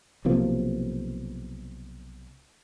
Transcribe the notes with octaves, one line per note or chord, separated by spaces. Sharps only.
B1 C3 F3 A#3